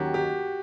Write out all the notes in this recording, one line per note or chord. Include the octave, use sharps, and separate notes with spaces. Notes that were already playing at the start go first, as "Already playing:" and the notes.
Already playing: D#2 D#3 F#3 A#3 C#4 F#4 G4
G4